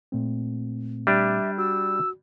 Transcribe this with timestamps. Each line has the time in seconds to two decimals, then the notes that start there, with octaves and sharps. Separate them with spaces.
0.12 A#2 A3 C4
1.07 G3 D4 E5
1.58 F#4 E6